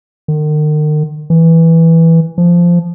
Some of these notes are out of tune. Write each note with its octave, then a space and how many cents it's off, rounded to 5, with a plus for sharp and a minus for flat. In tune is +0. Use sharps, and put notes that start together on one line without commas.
D#3 -40
E3 -5
F3 -10